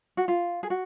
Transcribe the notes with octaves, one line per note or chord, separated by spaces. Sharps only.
F#4
F4
G#4
F#4